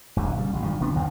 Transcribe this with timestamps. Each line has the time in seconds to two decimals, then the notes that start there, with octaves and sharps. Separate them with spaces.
0.16 D#1 A#1 E2
0.37 C#3 G3
0.53 A1 A#2
0.65 G2 D#3 F3
0.80 G#1 C3 B3 D4
0.93 A#1 E2 G2 D#3